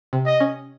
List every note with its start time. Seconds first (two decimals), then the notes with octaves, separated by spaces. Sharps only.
0.13 C3
0.26 D#5
0.40 C#4